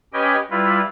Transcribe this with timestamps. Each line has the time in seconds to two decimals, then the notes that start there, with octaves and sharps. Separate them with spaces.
0.13 C#4 G4 B4 D#5 G5 G#5
0.51 G3 E4 F4 B4